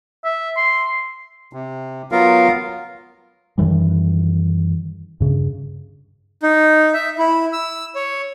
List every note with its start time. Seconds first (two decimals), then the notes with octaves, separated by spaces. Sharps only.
0.25 E5
0.57 C6
1.53 C3
2.12 F#3 B3 F4 A#4 F5
3.58 F#2 D#3 E3 G3
5.20 G2 C#3
6.43 D#4
6.94 E5
7.19 E4
7.53 E6
7.95 C#5